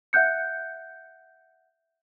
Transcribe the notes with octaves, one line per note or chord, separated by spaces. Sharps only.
E5 F#5 F#6 G6 C#7